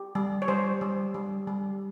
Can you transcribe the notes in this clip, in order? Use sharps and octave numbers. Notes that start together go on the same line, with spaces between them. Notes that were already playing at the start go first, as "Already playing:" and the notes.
Already playing: G4
G3
C#5
G3 C5
G3
G3
G3